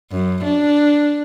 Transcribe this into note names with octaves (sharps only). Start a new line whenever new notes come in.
F#2
D4